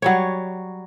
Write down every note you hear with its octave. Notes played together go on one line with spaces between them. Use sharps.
F#3 G3 C#5